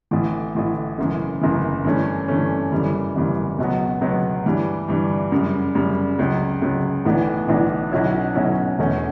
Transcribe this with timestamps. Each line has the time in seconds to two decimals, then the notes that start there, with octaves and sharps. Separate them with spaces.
0.11 A1 A2 E3
0.55 A1 A2 E3
0.98 F#1 F#2 E3
1.41 F#1 F#2 E3
1.84 G2 E3 A3 C#4
2.28 G2 E3 A3 C#4
2.72 F#1 F#2 E3 G3
3.16 F#1 F#2 E3 G3
3.59 C#2 B2 F#3 B3
4.01 C#2 B2 F#3 B3
4.46 G2 E3 G3
4.88 G2 E3 G3
5.32 F#2 C#3 G3
5.75 F#2 C#3 G3
6.19 C#2 C#3 F#3
6.62 C#2 C#3 F#3
7.05 B1 A2 E3 B3 D4
7.48 B1 A2 E3 B3 D4
7.92 B1 B2 F#3 C#4 E4
8.35 B1 B2 F#3 C#4 E4
8.78 E1 E2 B2 A3 C#4